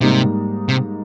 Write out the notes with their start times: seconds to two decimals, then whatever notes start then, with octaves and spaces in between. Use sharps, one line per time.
0.01 G#2 C3 G3 A#3 D#4
0.69 C3